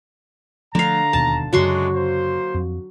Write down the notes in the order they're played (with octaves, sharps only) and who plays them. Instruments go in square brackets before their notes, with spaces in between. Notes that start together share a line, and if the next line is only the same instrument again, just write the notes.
[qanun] D3 F5 [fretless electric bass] F3 A3 D4 [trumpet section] A#5
[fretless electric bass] E1 D#2 B2 [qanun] A5
[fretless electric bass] F#2 C#3 [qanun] F#3 F#4 C6 [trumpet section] G#3 A3 D4
[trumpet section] A#3 C5
[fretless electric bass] F2